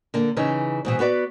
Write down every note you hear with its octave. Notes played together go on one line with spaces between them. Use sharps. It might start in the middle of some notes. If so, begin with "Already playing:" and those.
D3 A#3
C#3 E3 C#4 D#4
G#2 B2 E3
B3 F#4 B4 D5